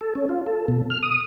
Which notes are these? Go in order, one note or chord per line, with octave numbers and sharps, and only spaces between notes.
A4
C#4
F4
A4
B2
F6
D#6